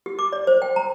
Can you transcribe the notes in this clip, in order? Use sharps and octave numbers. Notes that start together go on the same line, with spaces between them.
G4
D6
D5
C5
G5
A#5